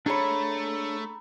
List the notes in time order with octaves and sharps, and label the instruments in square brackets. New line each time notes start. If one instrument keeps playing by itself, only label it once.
[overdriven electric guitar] A3 [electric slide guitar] D4 G#4 C#5 [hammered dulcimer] A#5 B5